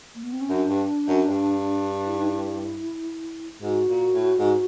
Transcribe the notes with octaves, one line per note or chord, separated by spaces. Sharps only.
A#3
B3
C4
C#4
F#2 D4
G2
F#2
G2
E4
D#4
E4
G#2 F#4
A#2
A2
G#2